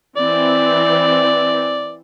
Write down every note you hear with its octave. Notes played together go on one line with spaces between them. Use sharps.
E3 C4 D5